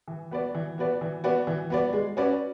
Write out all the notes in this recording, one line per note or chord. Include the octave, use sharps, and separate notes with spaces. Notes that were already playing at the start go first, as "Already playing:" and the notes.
E3
B3 F#4 B4 D5
E3
B3 F#4 B4 D5
E3
B3 F#4 B4 D5
E3
B3 F#4 B4 D5
G#3
C#4 F#4 B4 D5